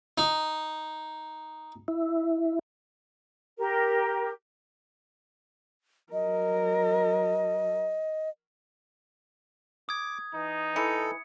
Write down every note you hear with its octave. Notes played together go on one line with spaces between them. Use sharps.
D#4
E4
G4 A#4
F#3 A#4 D#5
D6 D#6 G#6
E3 D#4
E3 A4 C#7